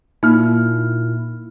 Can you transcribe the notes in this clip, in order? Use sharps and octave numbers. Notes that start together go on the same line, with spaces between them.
A#2 A#3 D#4 E4 F6